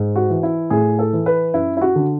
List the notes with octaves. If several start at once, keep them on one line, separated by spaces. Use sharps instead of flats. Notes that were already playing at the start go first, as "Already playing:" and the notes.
Already playing: G#2
F#4
E3
E4
A2 G#4
A4
E3
B4
F#2 E4
E4
F#4
D3